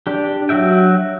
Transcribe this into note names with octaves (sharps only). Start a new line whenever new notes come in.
D4 G4
F#3 F#4 E5 G5